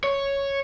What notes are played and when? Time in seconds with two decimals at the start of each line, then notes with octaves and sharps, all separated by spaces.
0.04 C#5